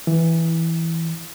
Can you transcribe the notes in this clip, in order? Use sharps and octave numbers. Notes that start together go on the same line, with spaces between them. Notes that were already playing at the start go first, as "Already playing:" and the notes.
E3